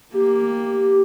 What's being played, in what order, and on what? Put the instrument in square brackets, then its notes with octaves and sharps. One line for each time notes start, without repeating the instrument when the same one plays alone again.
[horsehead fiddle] A#3 [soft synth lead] G4